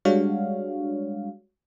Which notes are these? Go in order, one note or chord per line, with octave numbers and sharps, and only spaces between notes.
G3 G#3 D4 F#4 C#5 F5